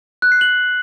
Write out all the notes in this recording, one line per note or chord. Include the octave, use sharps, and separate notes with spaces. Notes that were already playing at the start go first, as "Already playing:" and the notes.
F#6
C7
F#7